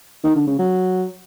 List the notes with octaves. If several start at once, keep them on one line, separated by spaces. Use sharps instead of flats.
D#3
D3
C#3
F#3